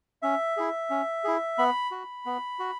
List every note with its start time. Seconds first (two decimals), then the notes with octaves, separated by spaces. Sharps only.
0.22 C#4 E5
0.57 E4 G#4
0.90 C#4
1.24 E4 G#4
1.58 B3 B5
1.91 F#4
2.26 B3
2.59 F#4